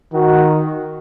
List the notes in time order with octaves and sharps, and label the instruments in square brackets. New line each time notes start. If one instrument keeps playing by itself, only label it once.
[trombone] D#3 [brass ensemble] F#4